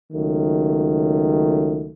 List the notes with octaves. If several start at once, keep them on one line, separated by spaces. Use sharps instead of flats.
C#2 D#3 F#3 A3